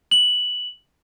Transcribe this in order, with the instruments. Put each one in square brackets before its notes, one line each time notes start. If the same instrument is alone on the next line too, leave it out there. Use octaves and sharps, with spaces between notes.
[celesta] F#7